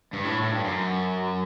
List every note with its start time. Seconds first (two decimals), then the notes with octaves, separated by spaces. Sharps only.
0.13 G2
0.25 A2
0.42 A2
0.52 G2
0.64 F#2